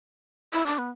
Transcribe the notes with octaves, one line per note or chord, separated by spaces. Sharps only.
E4
D4
B3